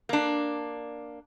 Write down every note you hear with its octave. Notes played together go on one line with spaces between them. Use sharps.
A#3 D4